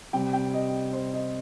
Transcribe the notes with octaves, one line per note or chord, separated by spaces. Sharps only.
C3 G3 C4 G5
G5
D#5
C5
D#5